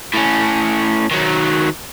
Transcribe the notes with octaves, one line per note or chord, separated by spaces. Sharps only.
A2 C#4
D#3 F#3